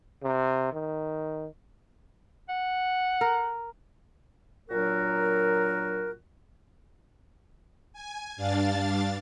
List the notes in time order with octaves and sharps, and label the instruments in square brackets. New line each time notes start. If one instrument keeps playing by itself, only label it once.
[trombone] C3
D#3
[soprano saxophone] F#5
[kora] A#4
[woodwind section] A#2 F#3 D4 F#4 A#4
[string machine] G#5
G2 D4 F5 A6